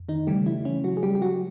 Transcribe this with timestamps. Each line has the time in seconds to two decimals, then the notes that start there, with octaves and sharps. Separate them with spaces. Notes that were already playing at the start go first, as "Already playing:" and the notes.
Already playing: F2
0.09 D#3 D#4
0.27 C#3 E3 G3 A3 G4
0.46 E3 E4
0.65 C#4
0.84 F#3 F#4
0.97 G#4
1.03 G3 G4
1.15 G4
1.22 F#3 F#4